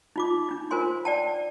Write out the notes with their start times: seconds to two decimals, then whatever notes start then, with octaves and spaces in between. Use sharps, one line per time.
0.16 D#4 F4 D6
0.49 D4 D#4
0.71 F4 A#4 C5 G#5 C6
1.05 D5 G5 A5